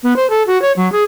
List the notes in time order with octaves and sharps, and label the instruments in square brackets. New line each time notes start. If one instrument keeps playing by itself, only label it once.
[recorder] B3
C5
A4
F#4
C#5
F#3
G#4